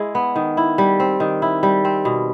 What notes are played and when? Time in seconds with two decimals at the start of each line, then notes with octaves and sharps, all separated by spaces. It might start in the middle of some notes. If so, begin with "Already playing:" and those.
Already playing: G#3 E4
0.15 B3
0.36 D#3
0.57 E4
0.78 G3
1.00 C4
1.20 D#3
1.42 E4
1.63 G3
1.85 C4
2.05 B2